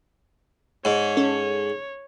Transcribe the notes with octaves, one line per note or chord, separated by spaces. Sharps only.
G#2 C#5
C#4 A4